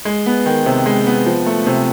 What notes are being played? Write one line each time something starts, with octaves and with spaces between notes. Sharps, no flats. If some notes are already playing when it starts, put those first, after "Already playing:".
G#3
B3
D#3
C3
G#3
B3
F3
A3
C3